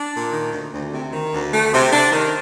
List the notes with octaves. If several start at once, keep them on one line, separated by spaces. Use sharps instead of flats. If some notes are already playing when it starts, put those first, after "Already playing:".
Already playing: D4
A#2
D#3
D2
D2
C3
D#3
D2
A3
C3
D4
D#3